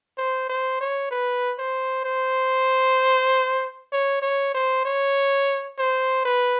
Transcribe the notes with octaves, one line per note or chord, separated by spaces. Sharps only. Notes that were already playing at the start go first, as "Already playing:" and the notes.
C5
C5
C#5
B4
C5
C5
C#5
C#5
C5
C#5
C5
B4